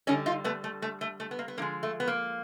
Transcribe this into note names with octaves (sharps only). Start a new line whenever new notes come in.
D3 G3 C#4 D#4
D#4 F4
A3 B3
A3
A3
A3
A3
B3
A#3
B3
D3 F3 G#3 A#3
A3
B3
A#3